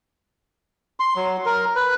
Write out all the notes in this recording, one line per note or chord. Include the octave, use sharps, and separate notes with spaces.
C6
F#3
A#4
B4